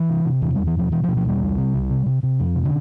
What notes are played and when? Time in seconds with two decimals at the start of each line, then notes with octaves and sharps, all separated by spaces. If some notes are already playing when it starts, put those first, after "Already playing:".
Already playing: E3
0.10 C3
0.25 C3
0.42 E2 E3
0.55 E2 G3
0.67 E3
0.76 B2 F3
0.92 B2 E3
1.04 F3
1.08 B2
1.17 F3
1.25 E2 G3
1.42 C2
1.58 C3
1.74 C2
1.90 C3
2.06 C3
2.23 C3
2.40 F2 F3
2.55 C3
2.65 D3